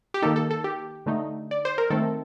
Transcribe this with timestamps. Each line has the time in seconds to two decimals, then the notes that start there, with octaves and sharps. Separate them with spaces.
0.14 G4
0.22 D#3 A#3 D#4 A4
0.36 A4
0.51 A4
0.64 G4
1.06 D3 A3 D#4
1.51 D5
1.65 C5
1.78 A#4
1.90 D#3 A3 C4 A4